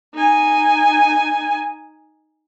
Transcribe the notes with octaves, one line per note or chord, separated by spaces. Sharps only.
D#4 G#5